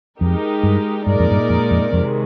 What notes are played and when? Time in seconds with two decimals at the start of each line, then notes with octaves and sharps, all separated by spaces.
0.20 F2 G#3 D#4 G4 A#4
0.63 G2
1.06 G2 A#2 G#3 D#4 A#4 D5
1.20 F2
1.31 G2
1.50 F2
1.71 F2
1.92 F2 C3 D#3 G#3